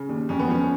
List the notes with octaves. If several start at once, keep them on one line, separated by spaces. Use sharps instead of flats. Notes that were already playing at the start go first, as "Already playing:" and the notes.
Already playing: C#3
D#2
F2 C#4
B3
F3 C#4